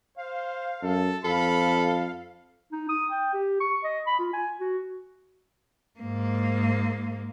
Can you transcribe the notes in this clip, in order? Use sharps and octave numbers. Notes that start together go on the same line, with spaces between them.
C5 F5
F#2 A4
F2 A4 F5 B5
D#4
D#6
G5
G4
C#6
D#5
B5
F4
G#5
F#4
G#2 A#3